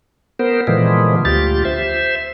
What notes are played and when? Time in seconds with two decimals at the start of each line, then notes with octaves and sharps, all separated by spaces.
0.39 B3 A#4 C5
0.67 A#2 D3 E3 F3 G#3 B3
1.25 D2 F4 G4 A6
1.65 C5 E5